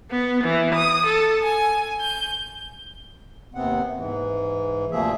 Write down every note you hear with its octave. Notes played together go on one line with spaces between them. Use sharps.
B3
E3
D#6
A4
G#5
G6
D#2 C3 B3 C4 F#5
G#2 E3
D2 C3 F3 A#3 G#4 E5